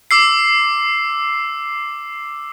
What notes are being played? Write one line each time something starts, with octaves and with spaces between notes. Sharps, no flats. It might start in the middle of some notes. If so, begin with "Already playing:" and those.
D6 E6 C7